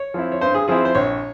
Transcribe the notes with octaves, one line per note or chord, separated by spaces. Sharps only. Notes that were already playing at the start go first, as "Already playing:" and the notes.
Already playing: C#5
F3 C4 E4
C#5
G2 C5
G#4
F3 C4 E4 G#4
C5
A#1 C#5